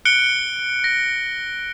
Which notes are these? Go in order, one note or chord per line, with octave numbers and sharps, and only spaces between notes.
F#6 C#7 D7 G7
A#6